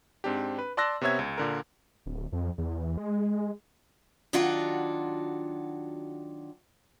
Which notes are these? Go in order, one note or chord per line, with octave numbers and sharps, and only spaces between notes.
G#2 C4 D4 G4
B4
D5 A5 C6 E6 F#6 A#6
C3 B3 C#5 E5 G#6
C#2
A#2 D3 A#4
D1
F2
E2
G#3
D#3 F#3 D4 F4 F#4 A4